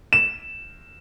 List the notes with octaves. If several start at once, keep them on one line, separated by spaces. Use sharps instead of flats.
E7